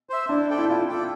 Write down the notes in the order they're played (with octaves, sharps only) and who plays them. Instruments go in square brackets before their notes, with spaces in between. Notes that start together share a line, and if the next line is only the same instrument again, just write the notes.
[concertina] C5 E5
[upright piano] D4 [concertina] E4
[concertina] A4 D5 G5
[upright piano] E4
[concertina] E4 [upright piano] F4
[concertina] A4 D5 G5